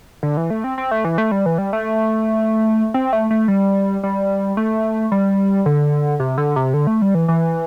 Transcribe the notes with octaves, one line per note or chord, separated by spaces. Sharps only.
D3
E3
A3
C4
C4
A3
E3
A3
G3
E3
G3
A3
C4
A3
A3
G3
G3
A3
G3
D3
C3
D3
C3
D3
A3
G3
E3
E3